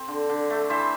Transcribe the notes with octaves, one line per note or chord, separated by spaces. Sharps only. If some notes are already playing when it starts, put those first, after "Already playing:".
Already playing: C4
D3
D3
A3
E3 C5 E5